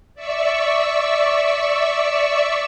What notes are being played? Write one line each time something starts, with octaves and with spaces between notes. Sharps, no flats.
D5 E5 C#6 E6